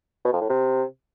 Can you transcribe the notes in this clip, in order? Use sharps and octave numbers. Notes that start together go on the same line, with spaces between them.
B2
F2
A2
C3